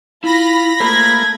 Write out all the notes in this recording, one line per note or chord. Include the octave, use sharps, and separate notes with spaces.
E4 F4 B5 A#6
A3 A#3 F4 G#4 C5 G#6